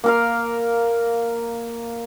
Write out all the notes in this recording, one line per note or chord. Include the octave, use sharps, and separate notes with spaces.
A#3 A#4 F5